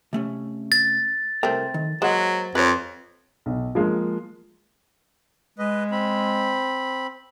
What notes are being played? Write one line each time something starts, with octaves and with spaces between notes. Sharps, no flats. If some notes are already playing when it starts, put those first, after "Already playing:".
C3 A3 C#4
A6
C2 A3 C4 A#4
D#3
F#3 G#3 A#3 C5 F#5
F2 B4 C#5
B1
F3 G#3 A#3
G#3 B4 D#5
C4 B5